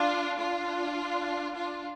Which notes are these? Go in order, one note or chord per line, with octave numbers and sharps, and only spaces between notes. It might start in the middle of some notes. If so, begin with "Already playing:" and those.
Already playing: D4 F4
D4 F4
D4 F4